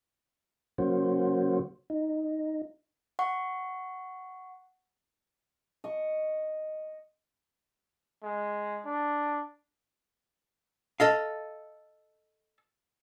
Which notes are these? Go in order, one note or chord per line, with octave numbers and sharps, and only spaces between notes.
C#3 F#3 A#3 C#4 F#4 C5
D#4
F#5 C#6
D#5 C#6
G#3
D4
A4 D#5 F5